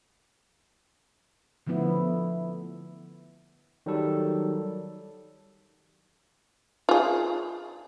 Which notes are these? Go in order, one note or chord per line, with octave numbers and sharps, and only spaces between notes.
D3 F3 A3 B3 E4
D#3 F#3 G3 A4
F4 G#4